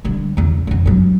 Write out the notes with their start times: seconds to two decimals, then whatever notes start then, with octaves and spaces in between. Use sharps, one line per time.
0.04 D3 G3
0.37 E2 C#3
0.67 F2 C#3
0.86 G2 F#3